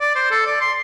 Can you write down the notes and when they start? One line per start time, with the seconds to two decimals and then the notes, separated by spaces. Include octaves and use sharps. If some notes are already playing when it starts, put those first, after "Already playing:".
0.01 D5
0.16 C5
0.31 A4
0.47 D5
0.61 C6